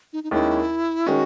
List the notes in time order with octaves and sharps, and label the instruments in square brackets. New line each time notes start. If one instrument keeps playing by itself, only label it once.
[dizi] D#4
D#4
[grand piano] D#2 D#3 G#3 C#4 [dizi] E4
[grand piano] D#3 G#3 C#4 [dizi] F#4